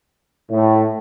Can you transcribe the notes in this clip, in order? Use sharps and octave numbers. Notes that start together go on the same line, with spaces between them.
A2